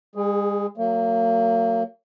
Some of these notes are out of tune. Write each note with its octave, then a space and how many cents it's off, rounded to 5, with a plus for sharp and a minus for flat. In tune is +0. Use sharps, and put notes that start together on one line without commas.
G#3 -45 G#4 +0
F#3 +0 A#3 -35